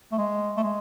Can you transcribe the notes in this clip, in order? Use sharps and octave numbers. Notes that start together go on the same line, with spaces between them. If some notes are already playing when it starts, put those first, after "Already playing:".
A3
G#3
A3
G#3